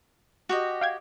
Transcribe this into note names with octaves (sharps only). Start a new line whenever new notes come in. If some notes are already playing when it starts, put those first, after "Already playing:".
F#4 G4 D#5
F5 G5 G#6